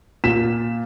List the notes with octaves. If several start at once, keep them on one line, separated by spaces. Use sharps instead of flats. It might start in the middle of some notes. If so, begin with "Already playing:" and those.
A#2 B6 E7